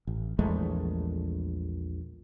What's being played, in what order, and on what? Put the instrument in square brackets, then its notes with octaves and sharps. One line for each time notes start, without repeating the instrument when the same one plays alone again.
[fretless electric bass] A1
A#1 E2 G#3 A3